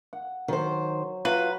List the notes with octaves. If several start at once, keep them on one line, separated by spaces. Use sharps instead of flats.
F#5
D#3 F#3 C5
F4 F#4 B4 A#5